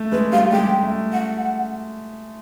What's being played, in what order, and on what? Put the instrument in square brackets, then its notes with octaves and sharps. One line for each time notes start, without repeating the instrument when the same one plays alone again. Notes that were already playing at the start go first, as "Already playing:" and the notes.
Already playing: [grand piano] A3
[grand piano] G#3 [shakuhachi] B4
[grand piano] G3 [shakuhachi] F5
[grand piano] G3
[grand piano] G#3 [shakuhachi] G5
[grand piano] A3
[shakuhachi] F#5